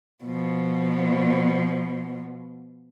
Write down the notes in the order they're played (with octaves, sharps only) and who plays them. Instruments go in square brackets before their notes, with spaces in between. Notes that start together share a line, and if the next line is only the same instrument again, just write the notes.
[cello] B2 F3